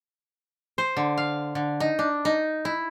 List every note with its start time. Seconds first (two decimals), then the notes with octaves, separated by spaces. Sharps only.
0.78 C5
0.97 D3
1.17 F5
1.55 D3
1.80 D#4
1.99 D4
2.25 D#4
2.65 E4